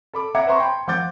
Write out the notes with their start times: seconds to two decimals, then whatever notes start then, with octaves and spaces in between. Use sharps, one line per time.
0.13 A4 B5 D6
0.35 E5 F#5 A#5 D6 G#6 C#7
0.47 B4 C5 E5 A#5 C6 C#6
0.60 G5 B5 C6
0.88 F3 F#5 D6 G6 A6